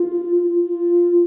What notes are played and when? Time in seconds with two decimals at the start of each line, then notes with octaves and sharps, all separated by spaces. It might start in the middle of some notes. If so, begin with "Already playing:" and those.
Already playing: F4
0.66 F4